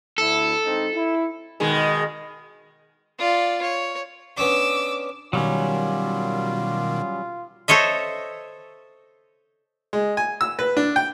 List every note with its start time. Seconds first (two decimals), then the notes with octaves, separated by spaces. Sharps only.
0.18 D2 E4 A4
0.64 G#2 C4 D#4
0.93 E4
1.60 B2 D#3 G#3
3.19 F4 D5
3.62 C#5
4.37 B3 C#4 D4 D6 E6
5.33 B2 D#3 F#3 G3 C#4 F4
7.68 A4 C5 C#5 D#5 E5
9.93 G#3
10.17 G#5
10.41 E6
10.59 B4
10.77 D4
10.96 G5